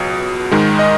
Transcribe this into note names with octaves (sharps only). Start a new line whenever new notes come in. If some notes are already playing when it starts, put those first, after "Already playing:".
Already playing: C#2 B2 F#3
G#2 D#3 G#3
D#5